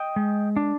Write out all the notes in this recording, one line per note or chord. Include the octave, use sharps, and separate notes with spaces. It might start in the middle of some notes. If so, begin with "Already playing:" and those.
Already playing: D#5 G5
G#3
D4